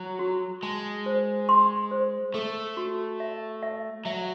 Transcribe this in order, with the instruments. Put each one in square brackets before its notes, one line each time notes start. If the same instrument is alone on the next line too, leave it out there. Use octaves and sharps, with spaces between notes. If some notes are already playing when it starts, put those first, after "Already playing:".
Already playing: [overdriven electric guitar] F#3
[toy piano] F#4
[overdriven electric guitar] G#3 [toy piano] A5
[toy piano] C5
C6
C5
[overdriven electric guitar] A3 [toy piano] A4
[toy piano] F#4
E5
E5
[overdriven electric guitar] F#3 [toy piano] E5